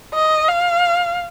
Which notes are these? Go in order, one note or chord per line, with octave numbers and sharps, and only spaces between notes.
D#5
F5